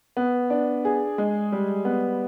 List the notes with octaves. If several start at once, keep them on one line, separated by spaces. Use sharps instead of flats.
B3
D4
G#4
G#3
G3
B3